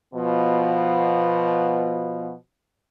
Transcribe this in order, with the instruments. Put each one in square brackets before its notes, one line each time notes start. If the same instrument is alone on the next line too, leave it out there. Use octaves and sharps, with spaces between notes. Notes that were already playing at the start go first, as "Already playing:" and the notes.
[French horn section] B2 F3 B3